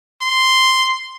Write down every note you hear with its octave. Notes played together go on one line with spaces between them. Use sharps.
C6